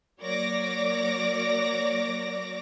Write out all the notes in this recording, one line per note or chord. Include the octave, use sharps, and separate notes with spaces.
F#3 A#3 C#5 D5 D6 A#6